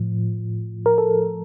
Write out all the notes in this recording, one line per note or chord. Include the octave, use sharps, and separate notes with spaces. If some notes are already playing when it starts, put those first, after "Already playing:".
Already playing: A2 F3
A#4
A4